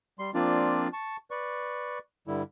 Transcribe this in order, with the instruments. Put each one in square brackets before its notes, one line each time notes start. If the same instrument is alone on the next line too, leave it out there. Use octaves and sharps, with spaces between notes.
[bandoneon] G3 C6
F3 A#3 C4 D4 F4 D5
A5 C#6
B4 D5 C#6
G2 D3 G3 E4